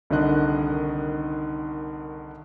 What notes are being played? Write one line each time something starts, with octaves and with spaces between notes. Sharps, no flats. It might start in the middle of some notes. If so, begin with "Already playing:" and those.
C2 D3 D#3 D#5 F#6